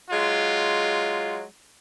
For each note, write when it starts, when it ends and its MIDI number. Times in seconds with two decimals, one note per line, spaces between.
0.10 1.42 54
0.10 1.42 56
0.10 1.42 65